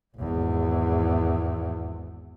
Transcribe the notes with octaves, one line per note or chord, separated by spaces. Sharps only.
G#1 E2